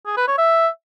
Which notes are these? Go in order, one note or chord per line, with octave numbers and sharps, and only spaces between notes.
G#4
B4
C#5
E5